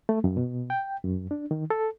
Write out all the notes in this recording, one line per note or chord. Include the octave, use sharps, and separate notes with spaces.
A3
F#2
B2
G5
F#2
D4
D#3
A4